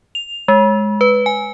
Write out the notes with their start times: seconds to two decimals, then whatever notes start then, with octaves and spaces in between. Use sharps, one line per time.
0.15 F7
0.48 G#3
1.01 B4
1.26 G#5